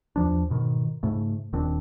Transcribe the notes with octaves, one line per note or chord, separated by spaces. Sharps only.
E2 F3 D4
G#2 B2 D#3
G#2 C#3 A3
D#1 D#3 C4 D4